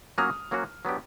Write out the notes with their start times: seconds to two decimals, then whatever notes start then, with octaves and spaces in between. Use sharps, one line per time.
0.18 F#3 A#3 C#4 F#4 D#6 F6
0.51 F#3 A#3 C#4 F#4
0.85 F#3 B3 D4 G4